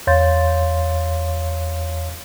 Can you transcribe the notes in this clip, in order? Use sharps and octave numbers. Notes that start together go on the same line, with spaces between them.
E2 C#5 F5 C6 G6 A6